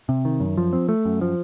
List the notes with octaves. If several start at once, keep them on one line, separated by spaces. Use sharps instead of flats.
C3
D#3
F#2
F3
C4
A3
F#2
F3